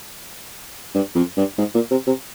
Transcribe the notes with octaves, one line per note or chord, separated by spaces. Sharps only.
G2
F2
G2
G#2
A#2
C3
C3